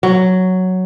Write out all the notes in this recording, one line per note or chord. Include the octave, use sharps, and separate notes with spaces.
F#3